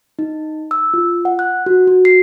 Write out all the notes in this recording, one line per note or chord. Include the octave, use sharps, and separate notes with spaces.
D#4
E6
F4
F#5
F#6
F#4
F#4
C7